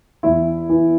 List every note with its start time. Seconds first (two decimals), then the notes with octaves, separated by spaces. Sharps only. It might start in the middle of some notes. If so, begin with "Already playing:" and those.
0.23 E2 E4
0.69 E3